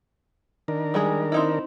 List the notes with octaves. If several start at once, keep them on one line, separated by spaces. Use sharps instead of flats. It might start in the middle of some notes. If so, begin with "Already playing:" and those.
D#3 D4 A#4
G3 G#3 G#4
C4 D#4 E4